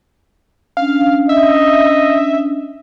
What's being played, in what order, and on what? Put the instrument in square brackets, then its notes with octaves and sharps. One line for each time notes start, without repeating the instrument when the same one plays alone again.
[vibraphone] C#4 D4 [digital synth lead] F5
[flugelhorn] D#5 [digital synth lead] E5